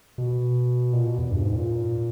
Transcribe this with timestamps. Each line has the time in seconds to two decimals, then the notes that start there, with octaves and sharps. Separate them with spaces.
0.18 B2
0.93 A#2
1.06 B2
1.18 E2
1.31 G2
1.43 G#2
1.55 A#2